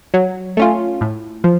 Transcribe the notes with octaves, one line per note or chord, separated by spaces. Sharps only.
F#3
A3 C#4 F4
A2
F3